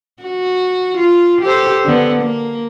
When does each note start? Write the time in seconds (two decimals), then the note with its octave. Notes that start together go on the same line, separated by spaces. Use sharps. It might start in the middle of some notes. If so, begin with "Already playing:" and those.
0.23 F#4
0.98 F4
1.42 G4 A4 C5
1.85 D3 B3
2.23 A#3